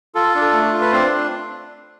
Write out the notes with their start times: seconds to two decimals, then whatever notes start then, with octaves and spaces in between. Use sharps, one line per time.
0.15 F4 A4
0.35 D4
0.41 A4
0.53 A3
0.73 F4
0.81 B4
0.92 C4 D4 C5